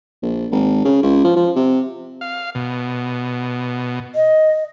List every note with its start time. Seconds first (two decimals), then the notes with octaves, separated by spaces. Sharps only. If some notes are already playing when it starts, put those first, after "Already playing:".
0.23 A#1
0.52 G#1
0.84 C#3
1.03 C#2
1.24 F3
1.36 F3
1.56 C3
2.21 F5
2.55 B2
4.15 D#5